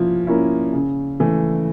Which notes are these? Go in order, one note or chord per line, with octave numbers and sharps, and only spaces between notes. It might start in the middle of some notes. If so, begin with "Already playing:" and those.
Already playing: F3 A#3 C#4 E4
A#3 C#4 E4
C#3
E3 A3